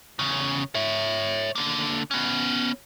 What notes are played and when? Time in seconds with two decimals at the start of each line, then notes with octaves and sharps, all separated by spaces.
0.19 E2 C#3
0.75 C#5 E5
1.55 D3 A#3
2.11 B3 C#4